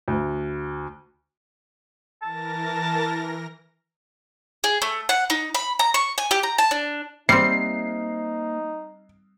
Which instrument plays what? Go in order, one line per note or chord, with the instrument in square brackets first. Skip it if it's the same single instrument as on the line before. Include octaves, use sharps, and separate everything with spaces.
[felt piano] D2
[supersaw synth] E3 A#4 A#6 [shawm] A5
[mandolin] G#4
A3
F#5
D#4
B5
A#5
C#6
G#5
G4
A#5
A5
D4
[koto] G3 C4 [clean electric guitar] A#3 C5 E5 [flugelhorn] D#4 [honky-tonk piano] C7